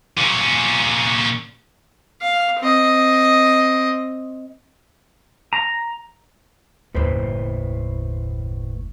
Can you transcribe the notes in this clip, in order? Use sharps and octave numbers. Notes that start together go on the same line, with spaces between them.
A#2 C#4
F5
C4 D#5
A#5
F#1 D#2 A2 B4 C5